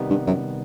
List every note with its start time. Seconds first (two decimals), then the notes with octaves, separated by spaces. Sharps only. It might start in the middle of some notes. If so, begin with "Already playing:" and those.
Already playing: C3 D#3 G3 B3 D#4
0.10 G2
0.27 F#2